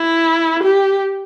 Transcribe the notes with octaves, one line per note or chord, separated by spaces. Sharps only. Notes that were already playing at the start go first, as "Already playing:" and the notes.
Already playing: E4
G4